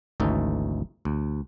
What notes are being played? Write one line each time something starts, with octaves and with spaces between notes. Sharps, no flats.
G#1 D2 E3 C#4 D#4 A4
D2